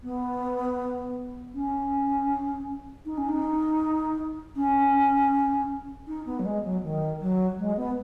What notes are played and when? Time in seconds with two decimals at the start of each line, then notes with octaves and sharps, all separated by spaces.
0.03 B3
1.54 C#4
3.05 D#4
3.17 C#4
3.28 D#4
4.56 C#4
6.07 D#4
6.25 B3
6.39 F#3
6.45 G#3
6.64 F#3
6.83 D#3
7.20 F#3
7.58 G#3
7.76 B3